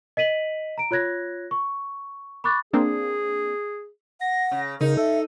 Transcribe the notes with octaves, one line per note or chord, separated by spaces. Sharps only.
D#5 B6 D#7 F#7
A#5 D7
F4 C#5 F#6 G#6 A#6
C#6
B5 C#6 D6 F#6 A6
A#3 C4 D4 G#4
F#5 A#6
C#3
C#3 D#4 A#4
A4 E5